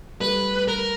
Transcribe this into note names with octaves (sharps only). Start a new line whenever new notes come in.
G3 A3 B4
A#4